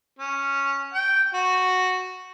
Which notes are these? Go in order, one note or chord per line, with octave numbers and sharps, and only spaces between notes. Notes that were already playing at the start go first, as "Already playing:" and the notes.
C#4
G5
F#4